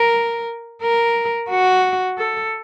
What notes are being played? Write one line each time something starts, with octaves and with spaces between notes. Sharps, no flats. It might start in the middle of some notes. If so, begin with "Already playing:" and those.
Already playing: A#4
A#4
F#4
A4